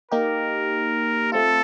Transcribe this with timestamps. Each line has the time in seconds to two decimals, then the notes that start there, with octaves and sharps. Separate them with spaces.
0.12 A#3 D#4 G4 A#4
1.32 A3 C4 F4 A4